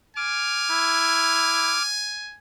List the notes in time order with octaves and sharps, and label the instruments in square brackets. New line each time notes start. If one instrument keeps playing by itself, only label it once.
[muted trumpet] G#5 [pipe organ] D6 F6
[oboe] E4